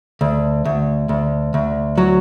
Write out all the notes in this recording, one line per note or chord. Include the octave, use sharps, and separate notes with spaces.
D2
D2
D2
D2
F#3